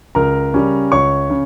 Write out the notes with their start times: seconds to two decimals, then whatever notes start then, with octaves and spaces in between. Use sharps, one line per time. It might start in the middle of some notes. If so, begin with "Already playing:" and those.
0.15 C#2 A#4 A#5
0.54 C#3 G3 C#4
0.92 C#2 C#5 C#6
1.30 C#3